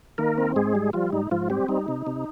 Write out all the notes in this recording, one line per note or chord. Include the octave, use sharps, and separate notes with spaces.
D#3 A#3 A#4
C4
G#2 G#3 G#4
G3
F3 G3 F4
G#2 D#4
G#2 F3 F4
G3 C4 G4
G3 D#4
C3
C3